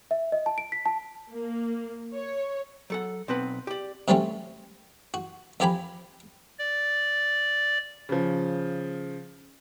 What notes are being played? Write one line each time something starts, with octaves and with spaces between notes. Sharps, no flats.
E5
D#5
A5
D7
B6
A5
A#3
C#5
F#3 A4 F#5
B1 C4 B4 F#5
G4 D5
C3 F#3 G3 A3 C4 C#4
F#4
F2 F3 G4 G#5 A#5 B5
D5
C#3 F3